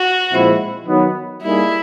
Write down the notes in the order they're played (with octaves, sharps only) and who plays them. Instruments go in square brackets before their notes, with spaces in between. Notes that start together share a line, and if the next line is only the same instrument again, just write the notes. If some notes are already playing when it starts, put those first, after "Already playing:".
Already playing: [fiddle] F#4
[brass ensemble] A#2 F3 G#3 C4 E4
D#3 F#3 B3
[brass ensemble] G3 A#3 D#4 G#4 [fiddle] E4